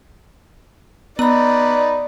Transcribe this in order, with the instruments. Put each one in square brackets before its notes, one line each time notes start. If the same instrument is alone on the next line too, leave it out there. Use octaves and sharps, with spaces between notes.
[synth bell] B3 [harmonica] D#4 B4 [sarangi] D5 [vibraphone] A#5 B5